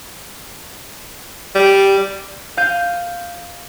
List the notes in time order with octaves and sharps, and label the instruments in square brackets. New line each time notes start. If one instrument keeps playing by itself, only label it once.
[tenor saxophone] G3
[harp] F5 G6 D#7